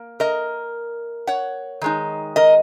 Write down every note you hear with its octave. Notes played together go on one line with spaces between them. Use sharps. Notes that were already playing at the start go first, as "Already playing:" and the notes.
Already playing: A#3
A#4 D#5
C#5 F#5
D#3 G#3 D#4
A#4 D#5